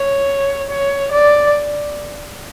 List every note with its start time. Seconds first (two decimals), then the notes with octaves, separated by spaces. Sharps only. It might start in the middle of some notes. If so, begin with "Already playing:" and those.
Already playing: C#5
0.70 C#5
1.12 D5